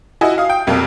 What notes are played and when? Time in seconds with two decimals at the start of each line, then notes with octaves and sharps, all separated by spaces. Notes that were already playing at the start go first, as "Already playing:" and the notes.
0.21 E4 F#4 D#5 G#5
0.38 F5 D#6
0.49 G5
0.67 F1 B1 F2 A#3